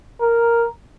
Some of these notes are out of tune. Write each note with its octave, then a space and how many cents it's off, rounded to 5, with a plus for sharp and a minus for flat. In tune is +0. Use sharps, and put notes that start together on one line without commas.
A#4 +0